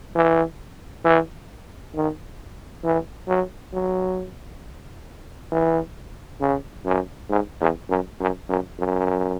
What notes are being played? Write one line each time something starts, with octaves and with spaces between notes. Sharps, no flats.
E3
E3
D#3
E3
F#3
F#3
E3
C#3
F#2
G#2
E2
F#2
F#2
F#2
F#2